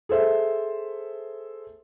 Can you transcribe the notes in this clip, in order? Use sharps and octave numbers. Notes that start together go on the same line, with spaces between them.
G#4 A4 C5 E5